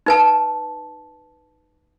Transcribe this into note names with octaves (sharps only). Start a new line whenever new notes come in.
D#4 B4 A5